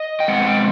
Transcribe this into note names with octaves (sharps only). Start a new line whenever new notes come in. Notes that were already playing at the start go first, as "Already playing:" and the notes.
Already playing: D#5
G5
B2 G#3 C4 F#5
G5